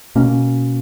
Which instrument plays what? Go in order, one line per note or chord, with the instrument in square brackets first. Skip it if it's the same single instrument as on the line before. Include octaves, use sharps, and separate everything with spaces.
[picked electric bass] B2 A#3 C#4